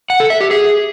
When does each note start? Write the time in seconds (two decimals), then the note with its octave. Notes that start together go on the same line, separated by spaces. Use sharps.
0.10 F#5
0.20 A4
0.30 E5
0.41 G4
0.51 G#4